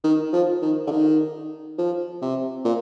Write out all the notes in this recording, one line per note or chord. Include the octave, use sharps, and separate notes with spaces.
D#3
F3
D#3
D3
D#3
F3
C3
A#2